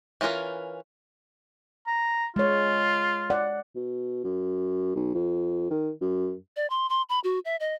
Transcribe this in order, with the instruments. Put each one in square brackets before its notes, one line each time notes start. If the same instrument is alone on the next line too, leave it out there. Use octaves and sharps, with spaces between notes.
[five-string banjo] E3 C#4 F4 A#4 B4
[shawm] A#5
[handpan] G#3 C#5 [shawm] F4
[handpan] D5 F#5
[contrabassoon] B2
F#2
B1
F2
D#3
F#2
[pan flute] D5
C6
C6
B5
F#4
E5
D#5